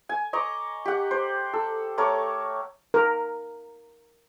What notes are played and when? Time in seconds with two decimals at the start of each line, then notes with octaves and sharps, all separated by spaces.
0.09 G#5
0.33 D#5 A#5 C#6 D6
0.85 G4 F#5
1.11 C5
1.53 A4
1.98 A3 A#4 C#5 D6
2.94 A#4